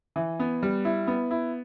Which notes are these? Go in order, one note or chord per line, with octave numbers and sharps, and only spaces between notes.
E3
B3
G3
E4
B3
E4